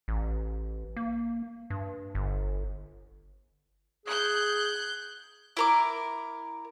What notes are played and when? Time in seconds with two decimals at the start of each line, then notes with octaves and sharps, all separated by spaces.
0.08 A1
0.97 A#3
1.70 G2
2.15 G1
4.06 G#4 F#6 G6
5.57 E4 A#4 D6